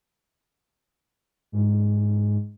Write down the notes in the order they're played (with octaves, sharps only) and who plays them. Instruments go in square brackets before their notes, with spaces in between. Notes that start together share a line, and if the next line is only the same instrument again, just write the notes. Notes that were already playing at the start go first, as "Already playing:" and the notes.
[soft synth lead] G#2